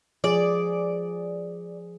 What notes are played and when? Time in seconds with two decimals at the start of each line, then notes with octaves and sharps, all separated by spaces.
0.24 F3 G#4 D5